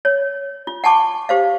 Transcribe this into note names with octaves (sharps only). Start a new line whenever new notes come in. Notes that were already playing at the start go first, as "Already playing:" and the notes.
C#5
F4
F#5 G#5 A5 C#6 D6
G4 C5 F5